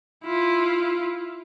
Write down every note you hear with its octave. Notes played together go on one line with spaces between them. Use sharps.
E4 F4